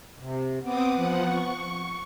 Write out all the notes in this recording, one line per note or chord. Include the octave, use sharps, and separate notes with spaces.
C3
B3 C4 D6 D#6
F3 F#5
C#6